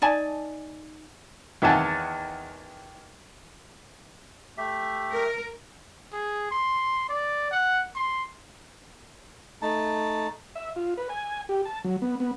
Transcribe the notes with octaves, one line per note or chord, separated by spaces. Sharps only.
D#4 D5 G#5 A5
E2 D#3 E5 F#5 G#5 A5
A3 G4 E5
A#4
G#4
C6
D5
F#5
C6
A3 D#4 A5
E5
F4
B4
G#5
G4
A5
F#3
B3
B3